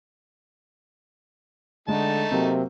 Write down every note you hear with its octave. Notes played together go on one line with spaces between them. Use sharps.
D3 G#3 A3 D#4 A5
C3 F#3 A#3 C4